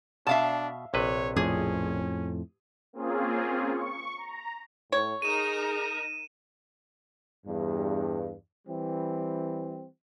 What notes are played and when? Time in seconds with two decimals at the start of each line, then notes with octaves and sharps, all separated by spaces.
0.27 B2 D4 E5 F5 A5
0.94 A#1 C3 B4 C#5
1.36 F2 A2 C#4 G#4
2.93 A#3 C4 C#4 F4 G#4
3.73 C#6
4.17 A#5
4.92 A2 C#5
5.22 D#4 G#4 A#4 A#5 D#7 E7
7.46 E2 G2
8.67 E3 G3 C4